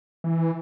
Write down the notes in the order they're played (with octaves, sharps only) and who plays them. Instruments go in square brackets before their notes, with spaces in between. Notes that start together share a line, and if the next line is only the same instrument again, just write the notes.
[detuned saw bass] E3